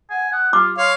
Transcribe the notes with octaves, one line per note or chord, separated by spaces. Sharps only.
F#5 G#5
F#5 D#6
F4 G4 D6
C#5 F5 C6